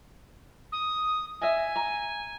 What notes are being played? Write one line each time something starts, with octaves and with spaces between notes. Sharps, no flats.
D#6
D#5 E5 G#5
A#5